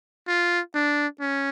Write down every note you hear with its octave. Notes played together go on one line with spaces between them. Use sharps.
F4
D4
C#4